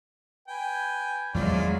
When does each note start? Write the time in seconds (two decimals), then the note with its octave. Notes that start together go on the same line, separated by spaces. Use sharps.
0.48 B4 G5 G#5
1.34 E2 D#3 F3 F#3 G#3 E4 F4 D5